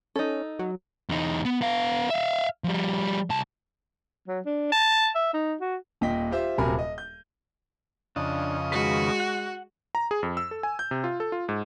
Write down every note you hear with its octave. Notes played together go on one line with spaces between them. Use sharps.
C#4 D#4 A4
F#3
E2 D#4
B3
B3 F5
E5 F5
F3 G3
C2 A5
F#3
D4
A5
E5
D#4
F#4
D#1 A#2 D#5 G5 B6
F4 G4 C5 E5
D#1 C3 F#3 A#4 G#5 B5
D#5
G6
F2 C#3 D4 D#5
D#3 G#3 F#4 B4
F#5
A#5
G#4
F2
E6
A4
G#5
G6
C3
F4
A4
F4
G#2